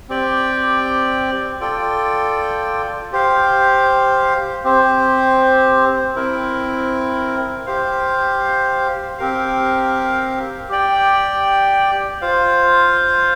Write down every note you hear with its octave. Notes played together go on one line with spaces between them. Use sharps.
C4 G4 D5 G5
F4 A4 D5 G5
G4 C5 F5
C4 G4 C5
C4 E4 A#4
G4 C5 F5
C4 G4 A#4 F5
G4 D5 G5
F4 C5 F5